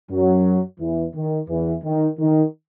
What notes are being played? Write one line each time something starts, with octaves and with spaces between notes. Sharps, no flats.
F#2 F#3
E2 E3
D#3
E2 E3
D#3
D#3